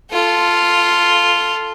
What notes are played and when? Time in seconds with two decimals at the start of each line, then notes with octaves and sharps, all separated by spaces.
0.12 F4 A4